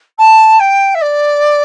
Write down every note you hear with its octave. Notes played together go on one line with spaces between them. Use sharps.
A5
G5
E5
D5